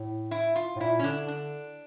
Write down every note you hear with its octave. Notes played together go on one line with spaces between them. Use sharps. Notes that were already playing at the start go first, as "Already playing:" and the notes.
Already playing: A2
E4
F4
A2
A#2 E4
C#4
D3 D4
D4